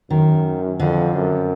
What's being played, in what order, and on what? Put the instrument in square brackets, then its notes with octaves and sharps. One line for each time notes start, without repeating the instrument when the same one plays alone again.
[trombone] F#2 [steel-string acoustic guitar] D#3
[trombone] F2 [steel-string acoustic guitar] D3
[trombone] F#2